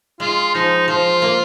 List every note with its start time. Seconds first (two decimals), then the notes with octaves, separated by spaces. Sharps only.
0.20 G#3 F4
0.54 F3 D#4
0.88 F3 F4
1.22 A#3